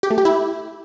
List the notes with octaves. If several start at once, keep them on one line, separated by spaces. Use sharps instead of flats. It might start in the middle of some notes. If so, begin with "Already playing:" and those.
G4
A3
G4
E4